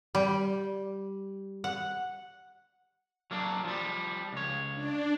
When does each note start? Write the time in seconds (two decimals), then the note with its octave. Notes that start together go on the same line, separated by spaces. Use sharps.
0.15 G3
1.64 F#5
3.31 F#3 A#3 D4
3.64 F3 G3
4.33 C#2 C#5
4.75 D4